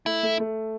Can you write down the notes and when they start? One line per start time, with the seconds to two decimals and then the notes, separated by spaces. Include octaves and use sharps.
0.06 A3 E4
0.23 A3
0.40 A3